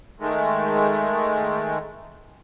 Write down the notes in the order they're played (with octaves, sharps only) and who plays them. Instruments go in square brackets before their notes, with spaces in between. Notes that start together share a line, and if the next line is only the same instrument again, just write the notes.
[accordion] D#3 G#3 A3